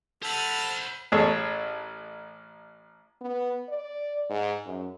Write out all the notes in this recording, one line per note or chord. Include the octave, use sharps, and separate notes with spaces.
A4 C5 F#5 B5 F6
A1 G#4 A4 C#5
B3
D5
G#2
F#2